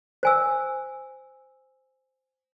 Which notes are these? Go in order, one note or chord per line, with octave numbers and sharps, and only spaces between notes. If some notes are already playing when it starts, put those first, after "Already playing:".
C5 G#5 E6